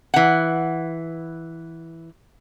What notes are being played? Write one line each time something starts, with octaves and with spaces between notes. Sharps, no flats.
E3 F#5